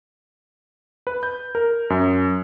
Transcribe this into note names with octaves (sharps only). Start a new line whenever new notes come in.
B4
G6
A#4
F#2